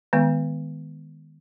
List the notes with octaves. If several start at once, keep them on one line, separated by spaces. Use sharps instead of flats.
D#3 G#3 B3